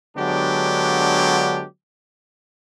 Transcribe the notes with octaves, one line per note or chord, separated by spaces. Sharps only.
D3 F#3 G#3 B3 D4 G4